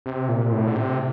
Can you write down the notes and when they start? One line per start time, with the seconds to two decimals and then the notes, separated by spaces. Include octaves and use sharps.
0.06 C3
0.29 A#2
0.52 A2
0.68 D3
0.74 C3